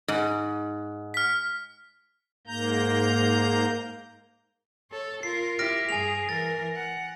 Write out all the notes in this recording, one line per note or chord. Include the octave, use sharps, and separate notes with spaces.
G#2
F6 B6
G#2 A#3 A#5 G6
A4 C#5
F4 A#4 C7
E4 G4 F6 A#6 D7
G2 G#4 G#5 F7
E3 A#4 A6
F#5